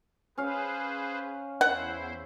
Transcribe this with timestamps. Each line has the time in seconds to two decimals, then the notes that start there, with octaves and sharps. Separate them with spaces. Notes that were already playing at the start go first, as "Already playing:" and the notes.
0.38 C#4 G#4 B4 C5 F5
1.61 E2 E4 C5 F#5